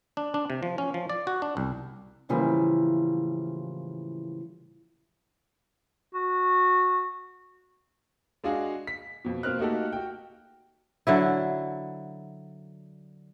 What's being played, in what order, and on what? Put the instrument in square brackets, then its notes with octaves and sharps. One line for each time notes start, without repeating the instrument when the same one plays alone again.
[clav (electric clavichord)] D4
D4
C3
F3
C#4
F3
D5
F#4
D4
C2
[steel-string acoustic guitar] A2 C#3 E3 F3 G3 A#3
[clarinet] F#4
[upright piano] G#3 D4 F#4 G#4 F5
B6
F2 B2
B2 A#3 C4 F6 F#6
A3 A#3 D#4 F#4 G4 A4
F#4 G5
[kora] D3 F#3 E4